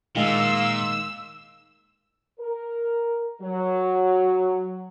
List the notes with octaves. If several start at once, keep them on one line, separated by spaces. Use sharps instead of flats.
A#2 D#3 G#3 F5 E6
A#4
F#3